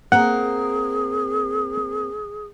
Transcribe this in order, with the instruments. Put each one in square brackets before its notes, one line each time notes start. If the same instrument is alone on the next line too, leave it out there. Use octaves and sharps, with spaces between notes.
[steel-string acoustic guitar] A#3 C4 A#4 [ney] G#4 [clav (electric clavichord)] F#5